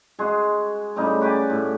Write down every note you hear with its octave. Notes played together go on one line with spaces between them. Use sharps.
G#3 F#4 G#4
A2 C#3 G3 D#4
F#4 G4 D5 G#5
A2